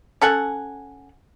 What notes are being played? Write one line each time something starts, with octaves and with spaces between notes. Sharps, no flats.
C#4 A4 F#5 G#5